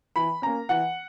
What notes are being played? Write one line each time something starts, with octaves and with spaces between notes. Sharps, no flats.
E3 B5
A#3 C#4 A#5
E3 F#5